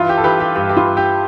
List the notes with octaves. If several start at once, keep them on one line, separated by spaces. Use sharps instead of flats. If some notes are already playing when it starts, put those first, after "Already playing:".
Already playing: G2 E3 F4
G4
A4
E3 G4 B4
G4
G2 G4
G4
F4
G2
G4